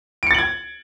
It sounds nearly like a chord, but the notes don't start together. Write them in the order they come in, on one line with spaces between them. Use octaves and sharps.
D7 C#7 A6 F#7 G#6